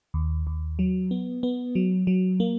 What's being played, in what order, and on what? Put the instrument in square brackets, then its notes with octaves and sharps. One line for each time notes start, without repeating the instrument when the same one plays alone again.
[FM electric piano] D#2
D#2
F#3
B3
B3
F#3
F#3
A#3